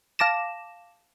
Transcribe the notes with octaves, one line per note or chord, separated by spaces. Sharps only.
F5 A5 D6 A#6 E7